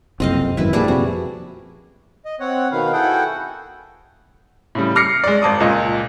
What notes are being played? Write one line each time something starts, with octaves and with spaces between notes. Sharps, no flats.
F#1 C2 F2 C4 D#5 F5
G#1 F#2 E4 B4
A#2 F3 G3 D4 G#4
F2 C3 F#4
D#5
C4 C#5 F#5
B2 D#3 B4 F5
E4 F#4 G#4 A4 F#5 G5
A2 C#3 G3
D6 F6 A#6 C7 C#7
G#3 D5
G#1 A5 D6 D#6
C#2 A#2 D#5